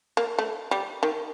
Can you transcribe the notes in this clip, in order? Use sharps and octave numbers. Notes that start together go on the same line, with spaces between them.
A#3
A3
G3
D#3